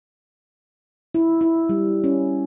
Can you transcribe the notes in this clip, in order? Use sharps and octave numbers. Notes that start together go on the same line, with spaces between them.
E4
E4
G3
C#4